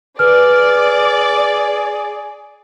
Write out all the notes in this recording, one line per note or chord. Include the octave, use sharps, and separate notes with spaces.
G#4 B4 D5 F6